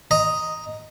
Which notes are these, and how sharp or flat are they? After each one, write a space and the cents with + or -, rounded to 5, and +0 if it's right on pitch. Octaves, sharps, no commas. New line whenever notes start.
D#5 +0 A#5 +0